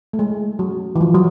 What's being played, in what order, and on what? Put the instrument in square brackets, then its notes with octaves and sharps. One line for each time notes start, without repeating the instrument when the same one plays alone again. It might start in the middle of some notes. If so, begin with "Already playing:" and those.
[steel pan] A3
G#3
F#3
E3
F3
F#3